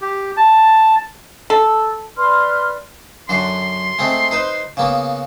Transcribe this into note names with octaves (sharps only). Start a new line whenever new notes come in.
G4
A5
A4
B4 D5 C6 F6
F#2 D3 F#4 C6
G#3 A3 C4
D#4 B4 C5
C#3 A#3 B3